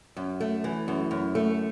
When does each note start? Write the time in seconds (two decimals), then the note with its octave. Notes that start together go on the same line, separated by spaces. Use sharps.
0.17 F#2
0.40 A3
0.64 E3
0.88 F#2
1.11 F#2
1.35 A3